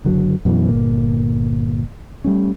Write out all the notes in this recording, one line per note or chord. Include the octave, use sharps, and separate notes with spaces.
F#1 D3 F#3
F#2 B2 D#3 E3
G1 A#2 A#3
G3 A3 C#4